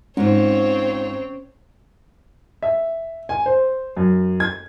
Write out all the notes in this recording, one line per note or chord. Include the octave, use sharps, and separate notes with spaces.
G#2 C4 C#4 F4 C#5
E5
G#5
C5
F#2
G#6